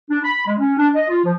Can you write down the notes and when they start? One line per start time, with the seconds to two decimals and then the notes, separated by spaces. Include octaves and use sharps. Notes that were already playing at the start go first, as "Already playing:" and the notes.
0.10 D4
0.23 B5
0.46 G#3
0.58 C#4
0.78 D4
0.95 D#5
1.09 F4
1.24 F3